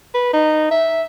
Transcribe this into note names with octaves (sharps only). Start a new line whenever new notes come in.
B4
D#4
E5